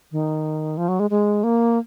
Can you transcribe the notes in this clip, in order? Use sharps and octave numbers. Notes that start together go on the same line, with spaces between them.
D#3
F3
F#3
G#3
G#3
A#3